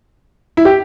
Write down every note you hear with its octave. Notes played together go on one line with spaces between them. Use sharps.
E4
G4